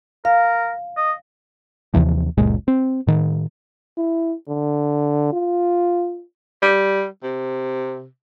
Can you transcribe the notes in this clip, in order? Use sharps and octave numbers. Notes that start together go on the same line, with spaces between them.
A#4 F5
D#5
D#2 C3 E3 F3
F#1 C#2 A#2 G#3
C4
A2 D#3
E4
D3
F4
G3
C3